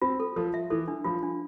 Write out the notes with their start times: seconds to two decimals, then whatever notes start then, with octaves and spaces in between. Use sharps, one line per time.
0.02 C4 F4
0.20 A4
0.36 F3 A4
0.54 E5
0.70 E3 A4
0.88 D4
1.04 F3 F4
1.23 D4